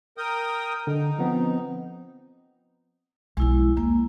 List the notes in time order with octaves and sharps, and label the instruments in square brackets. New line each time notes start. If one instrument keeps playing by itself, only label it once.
[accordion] A#4 G5 D#6
[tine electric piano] D3 [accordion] D#4
[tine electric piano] F3 B3 C4
[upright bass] B1 F3 [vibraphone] G#3 E4
[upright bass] D#2 [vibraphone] A#3